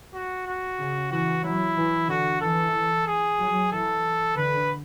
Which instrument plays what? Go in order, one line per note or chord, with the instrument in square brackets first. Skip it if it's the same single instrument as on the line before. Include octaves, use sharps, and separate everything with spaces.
[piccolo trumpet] F#4
F#4
[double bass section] C#3
[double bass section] E3 [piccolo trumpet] F#4
[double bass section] F#3 [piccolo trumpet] E4
[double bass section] E3
[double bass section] D3 [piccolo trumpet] F#4
[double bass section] E3 [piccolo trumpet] A4
[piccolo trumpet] G#4
[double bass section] F#3
[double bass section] E3 [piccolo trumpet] A4
[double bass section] D3 [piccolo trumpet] B4